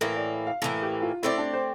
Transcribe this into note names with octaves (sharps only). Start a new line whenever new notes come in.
A2 E3 A#3 A#4
D5
F5
A2 E3 A#3 A4
G4
F4
A3 C4 E4 G4 D5
D4
C5